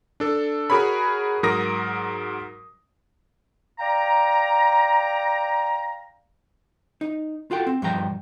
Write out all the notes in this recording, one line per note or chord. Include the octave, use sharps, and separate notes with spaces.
D4 A4
F#4 G#4 A#4 C#5 B5
G#2 F#3 A#4 D#6 A#6
D5 F5 G5 A#5
D#4
F4 F#4 A4 G5
C4
G2 B2 F3 G5 A#5